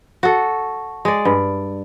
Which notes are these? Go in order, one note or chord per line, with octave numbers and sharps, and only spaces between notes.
F#4 A4
G#3 D5
G2